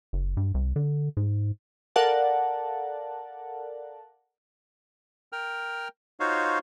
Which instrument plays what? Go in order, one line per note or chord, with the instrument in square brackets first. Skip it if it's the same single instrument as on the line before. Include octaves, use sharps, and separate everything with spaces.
[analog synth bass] F#1
G2
C2
D3
G#2
[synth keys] A4 A#4 D5 F5 F#5 A5
[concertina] A#4 G5 F6
D#4 F4 F#4 C5 C#5 F5